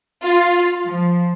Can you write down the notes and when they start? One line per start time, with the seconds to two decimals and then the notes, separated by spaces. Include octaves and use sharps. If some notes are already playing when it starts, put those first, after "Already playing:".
0.22 F4
0.84 F3